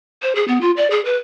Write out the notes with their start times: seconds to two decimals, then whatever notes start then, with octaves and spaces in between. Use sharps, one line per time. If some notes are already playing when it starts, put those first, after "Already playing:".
0.22 C5
0.35 G#4
0.48 B3
0.61 F4
0.77 D5
0.91 G#4
1.05 B4